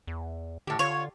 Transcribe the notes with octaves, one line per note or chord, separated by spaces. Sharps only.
E2
A2 D3 G4
D3 F4 C#5